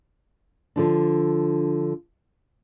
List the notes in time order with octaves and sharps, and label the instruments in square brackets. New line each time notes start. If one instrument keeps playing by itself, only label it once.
[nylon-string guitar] D3 F3 D4